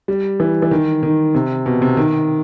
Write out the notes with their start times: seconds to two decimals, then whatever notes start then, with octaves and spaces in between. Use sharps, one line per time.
0.08 G3
0.40 E3
0.62 E3
0.71 D#3
1.03 D#3
1.35 C3
1.66 B2
1.82 C3
1.97 D#3